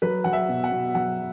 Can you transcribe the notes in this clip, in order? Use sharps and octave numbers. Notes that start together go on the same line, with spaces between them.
F#3 B4
F#3 F#5
E5
B2
F#5
B2
F#3 F#5